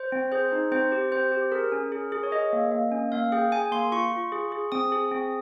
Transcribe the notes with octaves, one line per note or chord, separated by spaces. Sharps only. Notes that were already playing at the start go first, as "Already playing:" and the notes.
Already playing: C5
C4
G#4 C5
D#4
C4 C5
G4
C4 C5
G4
G#4 A#4
C#4
G#4
G#4
C#5
G#4 D#5
A#3
A#3
C#4
A#3 F5
G#4 G5
G#4 G#5
A#3 C6
F4 C#6
F4
G#4
G#4
C4 D#6
G#4
C4